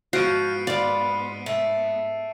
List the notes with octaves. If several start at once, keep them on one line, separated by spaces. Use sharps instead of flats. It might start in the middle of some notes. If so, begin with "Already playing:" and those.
G#2 F3 B3 F#4 C7 D7 D#7
F4 B4 D5
A3